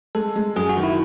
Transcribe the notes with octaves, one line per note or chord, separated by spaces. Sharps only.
G#3 A4
G#3
F#2 G#4
F#4
D#3
E4